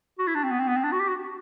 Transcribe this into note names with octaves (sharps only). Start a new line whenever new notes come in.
F#4
E4
D4
C4
B3
C4
B3
C4
D4
F#4
G4
F#4